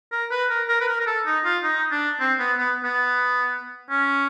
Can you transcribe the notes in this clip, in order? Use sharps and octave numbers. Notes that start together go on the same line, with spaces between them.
A#4
B4
A#4
A#4
B4
A#4
A#4
A4
D#4
F4
D#4
D4
C4
B3
B3
B3
C#4